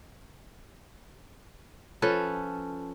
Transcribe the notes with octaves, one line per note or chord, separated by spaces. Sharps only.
F3 C#4 A4 B4